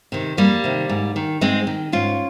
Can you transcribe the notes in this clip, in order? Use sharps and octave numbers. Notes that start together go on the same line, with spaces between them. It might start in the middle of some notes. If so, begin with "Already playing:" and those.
C3 D#3
F2 G3 A#3
C3 D#3
G#2
D#3
G#2 G#3 C4
D#3
G#2 C#4 F4